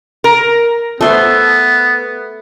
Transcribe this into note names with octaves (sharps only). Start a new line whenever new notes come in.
A#4
A3 B3 C5